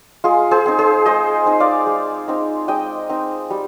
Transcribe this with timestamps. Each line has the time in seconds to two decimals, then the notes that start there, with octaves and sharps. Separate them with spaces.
0.24 G#3 F4 G#4
0.51 G#4 C5
0.66 C4 D#4
0.79 G#4 C5
1.06 G#3 C5 D#5
1.46 C4 D#4
1.60 D5 F5
1.87 G#3
2.28 C4 D#4
2.68 G#3 D#5 G5
3.10 C4 D#4
3.50 G3